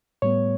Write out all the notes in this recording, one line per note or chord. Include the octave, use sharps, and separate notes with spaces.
A2 G3 B3 C#5